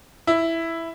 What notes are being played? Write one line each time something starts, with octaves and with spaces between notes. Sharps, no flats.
E4